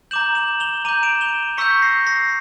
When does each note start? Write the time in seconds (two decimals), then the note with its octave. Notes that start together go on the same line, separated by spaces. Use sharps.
0.11 A#5 D6 G6 E7 F#7
0.35 E7 F#7
0.60 F7 G7
0.85 A#5 D6 G6 D#7 F7
1.03 D7 E7
1.21 F7 G7
1.57 C#6 E6 G6 B6 C#7
1.82 A#6 C7
2.07 A#6 C7